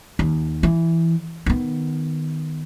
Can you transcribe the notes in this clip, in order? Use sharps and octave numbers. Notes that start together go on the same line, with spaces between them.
D#2
E3
D#3 B3